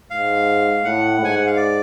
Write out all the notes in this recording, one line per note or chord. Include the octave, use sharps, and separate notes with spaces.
G#2 F5
A2 F#5
G#2 G#5
F#5
F5
D5